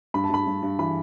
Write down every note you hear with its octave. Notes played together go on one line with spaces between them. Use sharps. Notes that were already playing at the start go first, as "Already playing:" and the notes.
G2 B5
A5
G2 B5
G2
G2
E3 B5